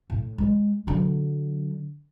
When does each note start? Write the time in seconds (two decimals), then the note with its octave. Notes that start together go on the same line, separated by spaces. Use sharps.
0.10 A2
0.38 G#3
0.87 D3 F#3